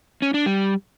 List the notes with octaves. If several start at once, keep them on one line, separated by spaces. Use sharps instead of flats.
C#4
D4
G3